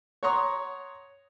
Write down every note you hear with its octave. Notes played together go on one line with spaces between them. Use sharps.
C#5 F#5 A#5 C6 C#6 D#6